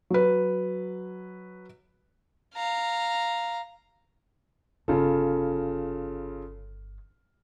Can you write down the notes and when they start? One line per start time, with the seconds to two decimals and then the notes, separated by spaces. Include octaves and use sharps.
0.10 F#3 B4
2.55 F5 A#5
4.88 G1 C#3 F4 A4